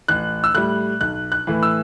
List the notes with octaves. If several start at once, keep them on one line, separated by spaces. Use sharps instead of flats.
A1 F#6
E6
A2 G3 F#6
B1 F#6
F#6
A2 E3
E6